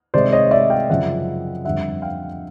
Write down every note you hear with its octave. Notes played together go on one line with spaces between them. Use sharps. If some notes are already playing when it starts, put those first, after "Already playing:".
C3 D#3 G#3 C5 D5
C#5 D#5
D5 E5
F5 G5
F#2 C#3 F3 E5 F#5
F2 D3 G3 E5 F#5
F5 G5